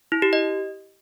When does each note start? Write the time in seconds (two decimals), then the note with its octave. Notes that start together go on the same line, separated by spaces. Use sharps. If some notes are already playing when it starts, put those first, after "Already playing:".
0.12 E4
0.22 G4
0.33 D#5